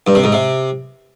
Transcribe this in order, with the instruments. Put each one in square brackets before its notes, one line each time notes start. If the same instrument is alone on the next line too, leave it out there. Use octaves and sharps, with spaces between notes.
[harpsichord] G2
C3
G#2
C3